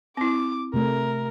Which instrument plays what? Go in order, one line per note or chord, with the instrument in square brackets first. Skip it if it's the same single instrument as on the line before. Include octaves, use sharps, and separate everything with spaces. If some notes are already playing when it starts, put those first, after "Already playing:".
[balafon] C4 E4 [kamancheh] D6
[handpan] C3 A3 [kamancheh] A#4